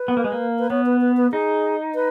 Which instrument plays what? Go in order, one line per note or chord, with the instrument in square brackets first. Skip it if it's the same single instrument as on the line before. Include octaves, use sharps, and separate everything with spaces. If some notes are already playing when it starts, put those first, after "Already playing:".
Already playing: [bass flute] B4
[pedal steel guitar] B3
A#3
G#3
A#3
[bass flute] B4
[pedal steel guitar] B3 [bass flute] C#5
[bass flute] B4
B4
B4
[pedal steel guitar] D#4 [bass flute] G#4
[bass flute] B4